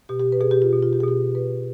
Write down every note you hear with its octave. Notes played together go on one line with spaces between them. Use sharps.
B2 G4
G4
B4
B2 G#4
G4
F4
B2
F4
G4
G#4
B2 G4
B2 B4